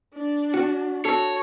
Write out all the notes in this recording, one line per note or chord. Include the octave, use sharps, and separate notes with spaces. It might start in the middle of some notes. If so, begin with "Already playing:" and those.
D4
F#4
F#4 A4 C#5